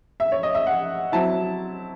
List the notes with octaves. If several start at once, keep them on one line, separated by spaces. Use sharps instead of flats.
E5
C#5
D#5
E5
F#5
F#3 C4 E4 A5